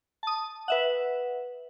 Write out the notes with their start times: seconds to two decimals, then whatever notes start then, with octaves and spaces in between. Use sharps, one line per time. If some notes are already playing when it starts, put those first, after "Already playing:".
0.23 A5 D#6
0.68 B4 E5 F#5